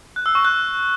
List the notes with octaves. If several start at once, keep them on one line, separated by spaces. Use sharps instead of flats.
F#6
E6
C#6
F#6